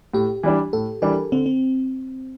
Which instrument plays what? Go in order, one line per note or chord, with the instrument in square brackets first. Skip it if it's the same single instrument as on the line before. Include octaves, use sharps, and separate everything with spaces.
[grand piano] A2 [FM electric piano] G4
[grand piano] E3 G3 D4
[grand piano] A2 [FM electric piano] A4
[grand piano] E3 G3 D4 [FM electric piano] A#4
[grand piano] D3 [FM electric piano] C4
[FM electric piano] C4